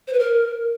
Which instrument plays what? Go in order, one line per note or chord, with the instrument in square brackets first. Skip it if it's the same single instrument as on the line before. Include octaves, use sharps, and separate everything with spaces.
[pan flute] C5
B4
A#4